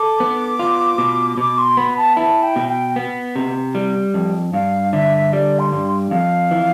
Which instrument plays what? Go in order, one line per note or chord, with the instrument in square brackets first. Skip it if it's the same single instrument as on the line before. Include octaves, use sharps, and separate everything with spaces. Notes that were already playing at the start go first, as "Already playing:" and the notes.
Already playing: [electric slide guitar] A4 [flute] D6
[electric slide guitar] B3
F4
B2
[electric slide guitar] B2 [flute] D6
[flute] C6
[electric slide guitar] B3 [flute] B5
[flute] B5
A5
[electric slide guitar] E4 [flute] A5
[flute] G5
[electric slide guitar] B2
[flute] G5
[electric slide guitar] B3
C3
G3
F2
[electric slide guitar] G2 [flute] F5
[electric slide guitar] D3 [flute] E5
[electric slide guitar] G3 [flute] D5
[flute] C6
[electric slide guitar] G2
[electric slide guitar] F2 [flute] F5
[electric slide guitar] E3